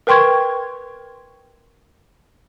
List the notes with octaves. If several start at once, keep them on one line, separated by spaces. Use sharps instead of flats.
A#4 B4 G5 C6 C#6 G#6